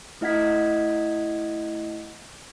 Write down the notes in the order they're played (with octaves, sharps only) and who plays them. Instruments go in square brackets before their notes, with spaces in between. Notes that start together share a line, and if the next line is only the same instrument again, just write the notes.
[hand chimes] A3 E4 D#5 F#5 G#6 B6